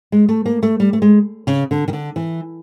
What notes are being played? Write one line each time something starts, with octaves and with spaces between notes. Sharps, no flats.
G#3
A3
A#3
A3
G3
A3
G#3
C#3
D3
D#3
D3
E3